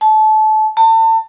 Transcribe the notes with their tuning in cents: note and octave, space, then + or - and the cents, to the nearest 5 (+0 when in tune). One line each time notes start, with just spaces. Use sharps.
A5 -25
A5 +35